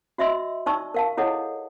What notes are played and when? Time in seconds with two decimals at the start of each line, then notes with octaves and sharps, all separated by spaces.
0.18 F#4 D#5 E5 C6 E6
0.66 D#4 D5 A5 C#6 E6
0.94 A#4 F5 A5
1.17 E4 G#4 A4 C#5 D#5 F#5